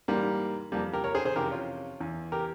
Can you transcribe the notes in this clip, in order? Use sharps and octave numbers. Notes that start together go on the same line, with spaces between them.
G#2 E3 G3 A#3
F2 E3 G3 A#3
G4 A#4
A#4 C#5
G#4 C5
G#4 C5
F2 C3 E3 G4 A#4
C#4 F4
E2 E3
G4 A#4